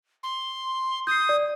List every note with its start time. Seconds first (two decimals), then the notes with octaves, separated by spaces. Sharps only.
0.23 C6
1.07 D#6 G6 C7
1.29 D5